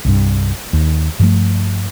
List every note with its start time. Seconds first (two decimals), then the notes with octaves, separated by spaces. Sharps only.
0.05 C2 G2
0.73 D#2
1.19 G2 F3 A3